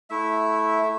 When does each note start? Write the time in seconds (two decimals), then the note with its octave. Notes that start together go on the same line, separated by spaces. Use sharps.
0.10 A3 E4 E5
0.82 A3